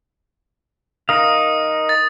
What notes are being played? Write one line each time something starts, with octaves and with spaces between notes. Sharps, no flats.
D#4 A#4 F5 D#6
A6